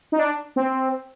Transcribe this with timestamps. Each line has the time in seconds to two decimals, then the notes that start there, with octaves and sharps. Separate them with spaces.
0.12 D#4
0.19 D4
0.56 C4